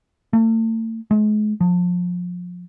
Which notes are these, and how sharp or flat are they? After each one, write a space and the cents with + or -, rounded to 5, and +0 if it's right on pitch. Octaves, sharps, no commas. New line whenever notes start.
A3 +40
G#3 +40
F3 +30